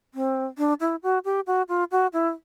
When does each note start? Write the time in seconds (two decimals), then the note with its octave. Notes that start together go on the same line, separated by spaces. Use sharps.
0.14 C4
0.58 D4
0.80 E4
1.03 F#4
1.25 G4
1.47 F#4
1.68 F4
1.91 F#4
2.13 E4